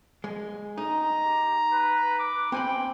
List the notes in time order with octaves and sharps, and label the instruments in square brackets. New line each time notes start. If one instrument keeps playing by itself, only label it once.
[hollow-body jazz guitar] G#3
[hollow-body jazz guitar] D#4 [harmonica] A#5
[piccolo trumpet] G4
B4
D6
[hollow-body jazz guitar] C4 G#5 B5 [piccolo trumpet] G5